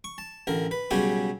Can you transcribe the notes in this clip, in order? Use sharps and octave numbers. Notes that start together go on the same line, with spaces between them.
C#6
A5
A1 D3 A#4
B4
B1 C#3 G3 F#4 G4 G#5